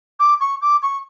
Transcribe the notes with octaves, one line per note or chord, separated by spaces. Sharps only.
D6
C#6
D6
C#6